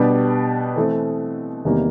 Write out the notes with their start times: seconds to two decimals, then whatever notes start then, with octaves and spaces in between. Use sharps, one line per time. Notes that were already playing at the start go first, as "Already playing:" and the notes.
Already playing: B2 G3 B3 D4 G4
0.76 E3 A3 C4
1.65 E2 C3 D#3 G3 A#3